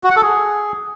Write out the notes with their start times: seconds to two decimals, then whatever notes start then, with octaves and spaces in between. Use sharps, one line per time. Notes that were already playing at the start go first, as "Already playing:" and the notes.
0.04 F#4
0.10 F#5
0.16 A4
0.22 G#4